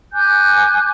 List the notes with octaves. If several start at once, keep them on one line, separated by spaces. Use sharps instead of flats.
G#5 D6 F#6 G6